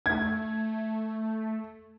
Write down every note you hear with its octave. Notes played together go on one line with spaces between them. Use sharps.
A3 G#6